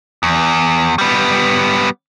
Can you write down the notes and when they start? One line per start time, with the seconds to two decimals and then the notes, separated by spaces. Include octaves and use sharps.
0.23 E2
0.98 G3 B3